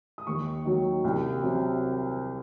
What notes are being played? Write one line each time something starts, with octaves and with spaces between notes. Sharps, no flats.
D#6
D#2 C#6
D#3 F#3
C2
C3 F#3